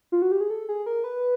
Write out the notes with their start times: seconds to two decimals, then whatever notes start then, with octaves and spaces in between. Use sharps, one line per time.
0.12 F4
0.22 F#4
0.32 G4
0.41 G#4
0.50 A4
0.69 G#4
0.86 A#4
1.04 B4